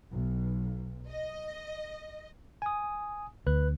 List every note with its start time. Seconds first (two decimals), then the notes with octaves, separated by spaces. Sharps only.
0.11 B1
1.09 D#5
2.62 G#5 D#6
3.47 D2 B4 F#6